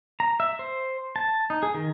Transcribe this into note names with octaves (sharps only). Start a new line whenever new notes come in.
A#5
E5
C5
A5
D#4
G#4
D#3